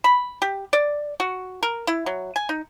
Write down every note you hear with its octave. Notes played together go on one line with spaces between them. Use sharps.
B5
G4
D5
F#4
A#4
E4
F#3
G#5
D#4